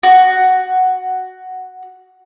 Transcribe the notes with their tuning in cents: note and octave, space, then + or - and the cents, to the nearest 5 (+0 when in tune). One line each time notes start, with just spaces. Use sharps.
F#4 +5